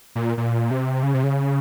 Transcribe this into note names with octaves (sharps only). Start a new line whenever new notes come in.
A#2
A#2
C3
C#3
C3
C#3